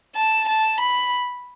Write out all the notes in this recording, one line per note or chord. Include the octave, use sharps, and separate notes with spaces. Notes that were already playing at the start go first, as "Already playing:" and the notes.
A5
A5
B5